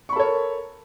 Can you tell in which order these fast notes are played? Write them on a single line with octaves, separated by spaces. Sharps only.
C#6 B5 A4 C#5 A#4